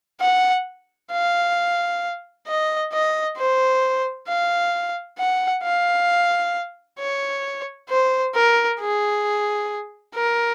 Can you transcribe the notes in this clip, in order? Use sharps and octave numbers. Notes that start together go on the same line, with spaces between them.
F#5
F5
D#5
D#5
C5
F5
F#5
F5
C#5
C5
A#4
G#4
A#4